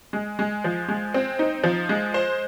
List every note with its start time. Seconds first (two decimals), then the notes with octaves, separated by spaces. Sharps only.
0.13 G#3
0.39 G#3
0.64 F3
0.89 G#3
1.14 C4
1.39 D#4
1.64 F3
1.89 G#3
2.14 C5